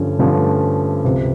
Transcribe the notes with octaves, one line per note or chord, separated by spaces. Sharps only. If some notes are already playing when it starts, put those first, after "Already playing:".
Already playing: G2 D3 F3 A3 C#4
G2 D3 F3 A3 C#4
C#2 C3 F3